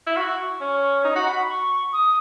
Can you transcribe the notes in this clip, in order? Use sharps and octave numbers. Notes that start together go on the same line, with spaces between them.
E4
F#4 C#6
C#4 C#6
C#6
D#4 A#5
F#4
F#4 B5
C#6
D#6